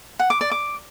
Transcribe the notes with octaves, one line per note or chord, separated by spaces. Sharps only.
F#5
D6
D5
D6